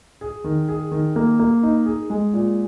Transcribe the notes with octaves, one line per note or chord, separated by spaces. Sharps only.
G#4
D#3
G#4
D#3
A#3
A#3
D#4
G#4
G#3
A#2